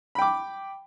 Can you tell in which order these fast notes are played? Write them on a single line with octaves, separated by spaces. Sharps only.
B5 G5 D6